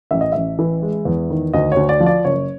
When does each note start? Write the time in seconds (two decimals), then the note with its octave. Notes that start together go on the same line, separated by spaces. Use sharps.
0.11 A1 E5
0.21 D#5
0.32 A1 E5
0.59 E3
0.82 G#3
1.05 E2
1.30 D#3
1.53 D2 D#5
1.72 D2 C#5
1.89 D5
2.00 F3
2.06 D5
2.25 F#1 C#5